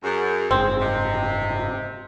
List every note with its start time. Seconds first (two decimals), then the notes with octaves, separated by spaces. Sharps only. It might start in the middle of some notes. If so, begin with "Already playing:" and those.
0.04 F#2 G#4
0.51 F#1 G#2 C4
0.81 C3 D#5